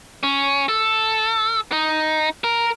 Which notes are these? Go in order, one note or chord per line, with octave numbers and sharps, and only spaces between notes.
C#4
A4
D#4
A#4